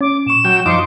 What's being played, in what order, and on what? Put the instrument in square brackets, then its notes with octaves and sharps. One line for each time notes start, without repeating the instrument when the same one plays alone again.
[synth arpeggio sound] C#4 [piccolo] D6
[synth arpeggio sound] A#2 C#6 [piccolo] E7
[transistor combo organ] F#3 G5
[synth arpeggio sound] F#2 C#7 [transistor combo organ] F3 D#4 D6 [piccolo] C6